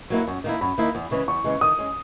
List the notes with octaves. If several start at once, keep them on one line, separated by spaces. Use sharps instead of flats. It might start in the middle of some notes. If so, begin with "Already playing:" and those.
F#3 A#3 E4
F#2
D#3 A#3 E4
F#2 B5
D#3 A#3 E4
E2
C#3 E3 G#3
E2 C#6
C#3 E3 G#3
D#3 D#6
G#3 C#4